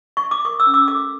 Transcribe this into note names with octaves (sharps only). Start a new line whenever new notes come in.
C#6
D6
A#4 C#6 D#6
D6 E6
C#4
D6 E6
A4 D6 E6